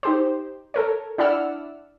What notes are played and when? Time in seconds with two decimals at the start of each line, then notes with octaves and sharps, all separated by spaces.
0.03 D#4 G4 C5
0.74 A4 A#4 C#5
1.18 D4 E4 D5 F#5 E6 F6